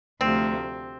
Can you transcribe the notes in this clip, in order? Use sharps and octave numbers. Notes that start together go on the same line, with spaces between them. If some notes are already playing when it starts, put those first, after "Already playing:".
D2 C3 F3 C4